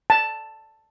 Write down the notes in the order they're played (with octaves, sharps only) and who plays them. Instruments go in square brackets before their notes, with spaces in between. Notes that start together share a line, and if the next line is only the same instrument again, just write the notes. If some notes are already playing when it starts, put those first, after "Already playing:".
[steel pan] A5